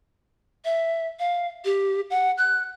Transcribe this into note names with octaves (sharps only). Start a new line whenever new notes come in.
E5
F5
G4
F#5
F#6